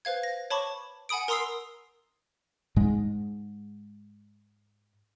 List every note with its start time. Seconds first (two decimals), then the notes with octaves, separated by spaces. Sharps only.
0.05 B4 C5 F5 G#6
0.23 A#6
0.50 C#5 A5 B5 C#6 D6
1.09 F#5 G#5 B5 D#6 D7
1.28 A#4 A#5 C6 D#6 E6 C7
2.76 G#2 G#3